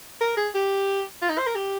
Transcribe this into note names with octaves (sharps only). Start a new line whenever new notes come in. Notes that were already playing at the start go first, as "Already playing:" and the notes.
A#4
G#4
G4
F4
D#4
C5
A#4
G4